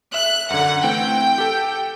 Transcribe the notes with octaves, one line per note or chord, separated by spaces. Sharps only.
E5 F#6
F#2 D3 F#5
E3 A3 C4 G5
G4 A4